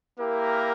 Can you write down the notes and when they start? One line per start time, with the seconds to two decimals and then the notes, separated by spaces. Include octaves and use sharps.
0.19 A#3 E4 G4 A#4